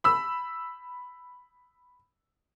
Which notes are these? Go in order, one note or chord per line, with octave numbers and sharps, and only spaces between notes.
B5 E6